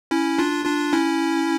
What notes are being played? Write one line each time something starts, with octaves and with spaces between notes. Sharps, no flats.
C#4 E4
D4 F4
D4 F4
C#4 E4